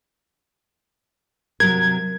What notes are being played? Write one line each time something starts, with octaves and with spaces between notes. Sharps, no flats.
C3 F#3 A#4 G#6